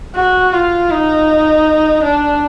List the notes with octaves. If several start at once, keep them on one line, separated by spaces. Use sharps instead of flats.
F#4
F4
D#4
D4